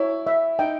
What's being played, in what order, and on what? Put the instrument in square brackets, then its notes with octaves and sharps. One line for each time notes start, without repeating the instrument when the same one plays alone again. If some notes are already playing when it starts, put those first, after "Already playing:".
Already playing: [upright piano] E4 [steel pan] C#5
[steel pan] E5
[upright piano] D#4 [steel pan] G5